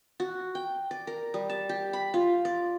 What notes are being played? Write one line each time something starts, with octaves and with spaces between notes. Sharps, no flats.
F#4
G5
D5
A#4
G3
A5
G4
B5
F4
D5